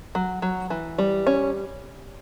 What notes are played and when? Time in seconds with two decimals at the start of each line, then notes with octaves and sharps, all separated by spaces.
0.15 F#3
0.42 F#3
0.70 E3
0.98 G3
1.27 C#4